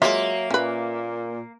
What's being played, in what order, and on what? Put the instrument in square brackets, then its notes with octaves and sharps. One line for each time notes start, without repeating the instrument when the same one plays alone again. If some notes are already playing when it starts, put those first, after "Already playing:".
[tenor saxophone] F#3 [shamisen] G#3 F4 [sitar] A#3 [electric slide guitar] E5
[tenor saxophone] A#2 [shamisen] C#4 B4